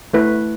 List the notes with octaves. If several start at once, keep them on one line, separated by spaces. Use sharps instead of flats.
A3 E4 B4